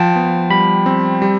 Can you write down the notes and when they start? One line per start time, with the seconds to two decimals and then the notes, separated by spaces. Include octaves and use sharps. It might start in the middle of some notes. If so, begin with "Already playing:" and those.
Already playing: F3 G5 A5
0.16 B3
0.50 G3 B5
0.86 C4
1.22 G3